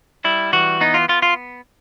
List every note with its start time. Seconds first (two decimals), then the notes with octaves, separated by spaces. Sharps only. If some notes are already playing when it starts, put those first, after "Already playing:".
0.24 G3 E4
0.53 E3 F#4
0.81 B3 D#4
0.94 F4
1.08 B3 F4
1.22 F4